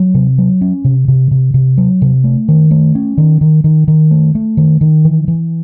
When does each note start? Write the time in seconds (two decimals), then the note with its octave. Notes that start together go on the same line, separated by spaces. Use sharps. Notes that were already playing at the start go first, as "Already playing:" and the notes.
Already playing: F#3
0.14 C3
0.38 F#3
0.61 C#4
0.85 C3
1.08 C3
1.31 C3
1.54 C3
1.78 F#3
2.02 C3
2.24 A3
2.48 D#3
2.71 A3
2.95 C#4
3.18 D#3
3.41 D#3
3.64 D#3
3.88 D#3
4.11 A3
4.35 A3
4.57 D#3
4.81 D#3
5.05 E3
5.28 E3